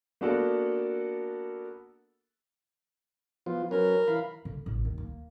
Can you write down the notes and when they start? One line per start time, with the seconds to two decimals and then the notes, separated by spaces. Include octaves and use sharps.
0.21 A#3 B3 D4 F#4 A4
3.46 F3 B3 F4
3.71 F#3 C#4 A#4 B4
4.08 E3 F5 B5
4.45 D3
4.66 A1
4.85 D#2
4.98 A#3